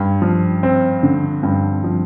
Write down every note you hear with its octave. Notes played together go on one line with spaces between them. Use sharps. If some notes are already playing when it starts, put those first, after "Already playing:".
Already playing: G2
F3
C4
D3
G2
F3